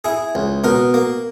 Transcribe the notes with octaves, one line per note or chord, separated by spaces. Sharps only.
E4 G#4
C#2
B2 A#4
A#3